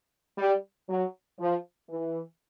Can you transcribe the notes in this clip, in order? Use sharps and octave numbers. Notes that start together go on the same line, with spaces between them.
G3
F#3
F3
E3